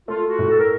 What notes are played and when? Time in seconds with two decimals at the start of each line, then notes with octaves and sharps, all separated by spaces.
0.08 A3 F4
0.25 F4
0.29 F#4
0.39 A2
0.49 A4
0.59 A#4